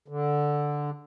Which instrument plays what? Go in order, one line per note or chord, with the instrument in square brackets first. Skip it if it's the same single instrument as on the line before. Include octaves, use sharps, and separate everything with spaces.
[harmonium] D3